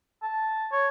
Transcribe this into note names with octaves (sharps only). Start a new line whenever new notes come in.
A5
C#5